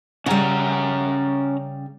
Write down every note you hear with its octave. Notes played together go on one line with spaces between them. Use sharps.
C#3 G3 C#4 F#5 A#5